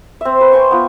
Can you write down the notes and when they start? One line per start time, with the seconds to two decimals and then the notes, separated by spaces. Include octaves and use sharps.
0.21 C4 E5
0.41 B4
0.52 G5 G#5 C6 C#6
0.71 B3 F4